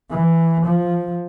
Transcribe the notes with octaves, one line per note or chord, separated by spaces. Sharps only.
E3
F3